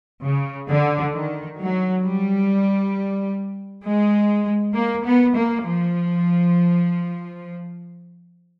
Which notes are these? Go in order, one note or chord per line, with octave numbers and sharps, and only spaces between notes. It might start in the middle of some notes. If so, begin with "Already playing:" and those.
C#3
D3
D#3
F#3
G3
G#3
A#3
B3
A#3
F3